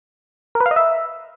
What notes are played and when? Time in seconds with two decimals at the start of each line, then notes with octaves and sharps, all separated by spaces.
0.55 A#4
0.60 B4
0.66 F5
0.71 D#5
0.76 E5